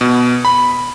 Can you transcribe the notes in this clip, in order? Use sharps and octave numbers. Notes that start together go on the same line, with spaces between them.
B2
B5